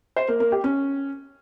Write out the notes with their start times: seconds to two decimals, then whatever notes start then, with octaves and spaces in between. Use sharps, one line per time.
0.16 C5
0.28 A#3
0.40 A#3
0.52 G4
0.64 C#4